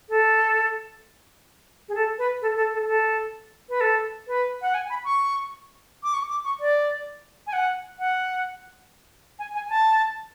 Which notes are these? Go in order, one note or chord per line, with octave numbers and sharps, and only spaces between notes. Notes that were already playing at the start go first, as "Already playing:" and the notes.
A4
G#4
A4
B4
A4
A4
A4
A4
B4
A4
B4
F#5
G#5
B5
C#6
D6
C#6
D6
C#6
D5
G#5
F#5
F#5
G#5
G#5
A5